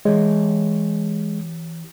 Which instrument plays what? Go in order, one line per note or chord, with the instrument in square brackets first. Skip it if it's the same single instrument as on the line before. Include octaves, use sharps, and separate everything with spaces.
[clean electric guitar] E3 G4 C#5 [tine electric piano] G#3